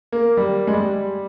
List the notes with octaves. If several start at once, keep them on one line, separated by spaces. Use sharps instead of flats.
A#3
G3
G#3
G3